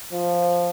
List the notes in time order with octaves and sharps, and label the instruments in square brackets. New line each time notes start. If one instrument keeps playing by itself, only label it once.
[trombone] F3